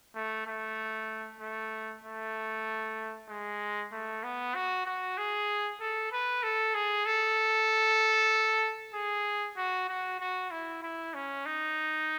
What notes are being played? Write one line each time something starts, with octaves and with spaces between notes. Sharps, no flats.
A3
A3
A3
A3
G#3
A3
B3
F#4
F#4
G#4
A4
B4
A4
G#4
A4
G#4
F#4
F#4
F#4
E4
E4
C#4
D#4